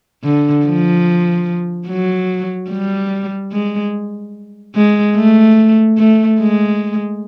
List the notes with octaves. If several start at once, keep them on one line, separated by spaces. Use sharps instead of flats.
D3
F3
F#3
G3
G#3
G#3
A3
A3
G#3